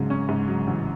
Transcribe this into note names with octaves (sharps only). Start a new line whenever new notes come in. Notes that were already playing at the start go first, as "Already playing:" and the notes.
Already playing: G#2 C#3 F#3
C#4
G#2
F#3
A1